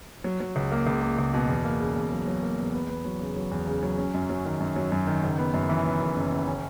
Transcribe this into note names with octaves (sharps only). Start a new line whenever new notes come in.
F#3
F#3
C#2
A#3
C#2
A#3
C#2
B2
E2
A#3
C#3
E2
F#3
F#3
A#3
E2
B3
B3
F#3
C#3
F#3
E2
C#3
F#3
C#4
F#2
F#3
D#3
F#2
F#3
F#2
D#3
F#1
B3
F#2
E3
B3
F#1
F#1
F#1
C#4